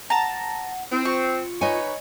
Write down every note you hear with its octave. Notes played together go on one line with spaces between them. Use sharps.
F#5 A5 A#5
C4 E4
F4 C#6
D#4 B4 C#5 D#5 G#5